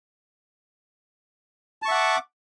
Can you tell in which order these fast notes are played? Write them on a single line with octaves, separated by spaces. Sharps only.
A5 C#6 E5 F#5 D6